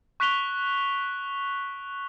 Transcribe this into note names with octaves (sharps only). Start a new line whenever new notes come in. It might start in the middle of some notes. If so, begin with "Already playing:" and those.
C#6 F#6 B6 D7 F7 G7